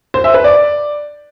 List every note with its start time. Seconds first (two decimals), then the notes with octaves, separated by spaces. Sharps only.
0.14 C5
0.24 E5
0.34 B4
0.44 D5